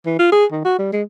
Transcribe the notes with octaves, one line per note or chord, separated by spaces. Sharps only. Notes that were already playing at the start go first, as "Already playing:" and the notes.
E3
F4
G#4
D#3
F#4
G3
G#3